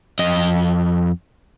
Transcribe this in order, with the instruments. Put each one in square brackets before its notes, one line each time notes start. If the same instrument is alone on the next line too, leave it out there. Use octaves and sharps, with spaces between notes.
[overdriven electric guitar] F2 D#5